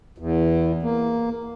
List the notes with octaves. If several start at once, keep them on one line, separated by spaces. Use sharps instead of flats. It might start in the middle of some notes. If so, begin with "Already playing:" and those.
E2
A#3